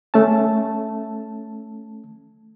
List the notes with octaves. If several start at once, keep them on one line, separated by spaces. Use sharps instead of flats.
A3 C#4 A5